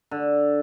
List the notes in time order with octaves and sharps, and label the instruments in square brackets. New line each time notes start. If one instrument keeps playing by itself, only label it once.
[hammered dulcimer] D3